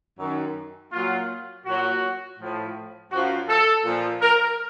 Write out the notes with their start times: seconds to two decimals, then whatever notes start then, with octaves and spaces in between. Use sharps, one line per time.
0.19 F#2 D#3 F#3
0.92 A#2 F#3 F4
1.65 A#2 F#3 F#4
2.39 A2 F3
3.12 F#2 F3 F#4
3.49 A4
3.85 A#2 F3
4.21 A#4